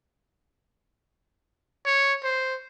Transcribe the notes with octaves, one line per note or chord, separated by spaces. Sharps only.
C#5
C5